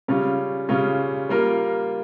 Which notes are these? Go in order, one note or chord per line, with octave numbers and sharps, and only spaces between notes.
C#3 G3 C#4 F4
C#3 G3 C#4 F4
G3 A#3 F4 A#4